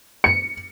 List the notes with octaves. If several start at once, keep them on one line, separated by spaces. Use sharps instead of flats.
C#7